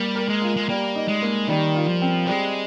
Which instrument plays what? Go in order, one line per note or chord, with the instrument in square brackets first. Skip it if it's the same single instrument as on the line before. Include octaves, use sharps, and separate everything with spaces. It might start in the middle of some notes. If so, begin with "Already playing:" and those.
Already playing: [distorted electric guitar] G3 [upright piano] A#3
[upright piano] A#4
[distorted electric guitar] G#3
[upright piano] F4
[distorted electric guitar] G#3
[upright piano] G3 [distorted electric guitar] A#3
[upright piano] D#4
[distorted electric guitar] G#3
[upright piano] A#3
[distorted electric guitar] D#3 [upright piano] G3
[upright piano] F4
[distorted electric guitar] F3
[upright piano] C4
[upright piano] G3 [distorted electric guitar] G#3